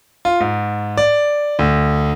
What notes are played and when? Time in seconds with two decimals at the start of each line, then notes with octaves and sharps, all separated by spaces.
0.25 F4
0.40 G#2
0.97 D5
1.59 D2